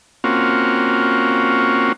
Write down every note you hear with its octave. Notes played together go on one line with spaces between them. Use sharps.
A#3 C4 C#4 F4 F#4